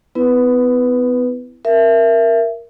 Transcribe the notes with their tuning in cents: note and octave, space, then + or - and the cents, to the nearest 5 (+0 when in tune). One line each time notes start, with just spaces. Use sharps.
B3 +30 E4 +0 B4 +0
A#4 +0 E5 +20